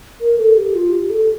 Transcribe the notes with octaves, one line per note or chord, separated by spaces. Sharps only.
A#4
A4
G4
F4
G4
A4